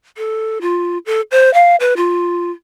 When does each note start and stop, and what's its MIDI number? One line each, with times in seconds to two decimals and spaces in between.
0.17 0.58 69
0.61 0.98 65
1.06 1.21 69
1.31 1.52 72
1.54 1.76 77
1.80 1.94 71
1.97 2.51 65